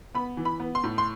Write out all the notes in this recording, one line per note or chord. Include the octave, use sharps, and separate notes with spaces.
B3 B5
E3
B5
B3
C6
A2
C6